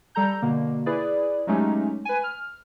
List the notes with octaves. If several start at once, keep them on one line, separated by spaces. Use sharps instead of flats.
G3 A4 A#5 G6
B2 D3 A#3
E4 G#4 B4 D5
F#3 G#3 A3 C#4 D#4 G4
B4 G#5
F6